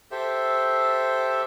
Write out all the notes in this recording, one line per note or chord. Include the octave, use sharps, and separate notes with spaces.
G4 A4 C5 E5